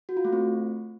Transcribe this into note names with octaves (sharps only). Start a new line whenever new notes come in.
F#4
F4
A3
C4